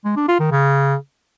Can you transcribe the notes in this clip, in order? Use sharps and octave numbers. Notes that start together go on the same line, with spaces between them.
G#3
D4
F4
D#3
C#3